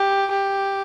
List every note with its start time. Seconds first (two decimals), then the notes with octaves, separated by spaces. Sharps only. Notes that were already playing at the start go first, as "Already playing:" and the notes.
Already playing: G4
0.31 G4